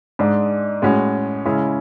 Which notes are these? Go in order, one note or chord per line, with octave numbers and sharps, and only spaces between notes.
G#2 G#3 D4
A2 G#3 C#4 F#4
C#3 G#3 C#4 E4